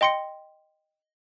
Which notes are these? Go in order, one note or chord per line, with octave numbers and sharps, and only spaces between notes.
D#5 G5 C6 A#6 C#7